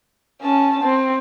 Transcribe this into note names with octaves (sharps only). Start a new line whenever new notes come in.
C#4 A5
C4